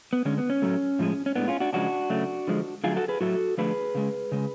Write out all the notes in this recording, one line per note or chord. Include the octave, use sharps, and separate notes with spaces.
B3
D3 G#3 C#4
B3
C#4
A2 F#3 A3
A2 F3 G#3
C#4
A2 G#3 B3 D4
C#4 F4
D4 F#4
C#3 F3 G#3 D4 F#4
C#3 F#3 A3
D3 F3 G#3
D3 F#3 A3 F4 G#4
F#4 A4
G#4 B4
A2 F#3 A3 F#4 A4
D3 F3 A3 G#4 B4
C#3 G#3
C#3 G#3